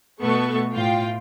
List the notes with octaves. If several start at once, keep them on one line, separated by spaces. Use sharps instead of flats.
B2 A3 B3 A4 C#6
A2 F4 G5